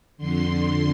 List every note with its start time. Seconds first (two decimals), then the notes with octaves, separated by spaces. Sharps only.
0.18 F2 D3 C6